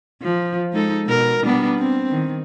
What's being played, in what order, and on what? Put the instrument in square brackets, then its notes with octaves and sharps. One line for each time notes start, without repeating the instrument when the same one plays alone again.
[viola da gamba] F3
G#3 D#4 A4
B2 A#4
G3 B3 D4
C4
D#3